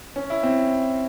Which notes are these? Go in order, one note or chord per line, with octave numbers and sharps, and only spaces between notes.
C#4
E4
C4